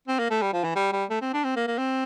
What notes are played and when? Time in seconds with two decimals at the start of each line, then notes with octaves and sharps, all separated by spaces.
0.08 C4
0.19 A#3
0.30 A3
0.42 G3
0.53 F3
0.64 E3
0.76 G3
0.93 G3
1.10 A3
1.21 C4
1.33 D4
1.44 C4
1.56 A#3
1.67 A#3
1.78 C4